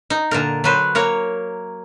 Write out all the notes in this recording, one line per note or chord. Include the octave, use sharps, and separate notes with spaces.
D#4
A#2 D3 A#4
F#3 B4 C5
A#3 A#4 C#5